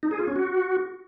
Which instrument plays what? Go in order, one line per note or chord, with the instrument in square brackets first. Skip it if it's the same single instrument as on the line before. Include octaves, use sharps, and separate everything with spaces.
[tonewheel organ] D#4
G#4
F4
C#4
F#4